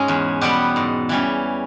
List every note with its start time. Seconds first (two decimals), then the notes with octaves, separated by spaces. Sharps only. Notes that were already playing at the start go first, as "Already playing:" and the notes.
Already playing: G#2 G#3 C#4 G#4
0.08 E2
0.41 B2 G3 B3 G4
0.76 G#2
1.09 E3 G3 C#4